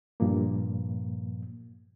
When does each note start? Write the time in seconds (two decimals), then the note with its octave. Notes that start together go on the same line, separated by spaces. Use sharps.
0.20 G2 A#2 F3 A#3